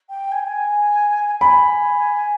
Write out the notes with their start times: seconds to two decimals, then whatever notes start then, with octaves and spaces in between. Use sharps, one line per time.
0.09 G5
0.32 G#5
0.39 G5
0.46 G#5
1.41 G#5 B5